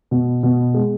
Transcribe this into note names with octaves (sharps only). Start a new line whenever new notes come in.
B2
B2
G#3